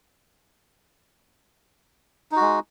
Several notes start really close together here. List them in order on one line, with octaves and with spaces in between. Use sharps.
D#4 F#4 G#3